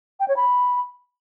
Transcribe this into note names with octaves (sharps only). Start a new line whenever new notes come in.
G5
C#5
B5